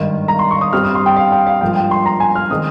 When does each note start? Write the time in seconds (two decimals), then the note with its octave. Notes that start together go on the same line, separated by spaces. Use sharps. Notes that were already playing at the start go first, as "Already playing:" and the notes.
Already playing: G#1 G2 D#3
0.28 A#5
0.39 C6
0.51 C#6
0.61 D#6
0.73 G2 G3 C4 F6
0.84 D#6
0.95 C6
1.06 G5
1.16 F5
1.32 G5
1.47 F5
1.61 G#1 G2 F3 A#3 G5
1.76 G5
1.91 C6
2.06 A#5
2.20 G#5
2.35 F6
2.50 D#3 G#3 C4 D#6